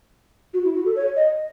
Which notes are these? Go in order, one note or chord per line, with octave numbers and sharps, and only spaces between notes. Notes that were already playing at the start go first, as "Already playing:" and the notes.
F#4
E4
F#4
A4
C#5
D#5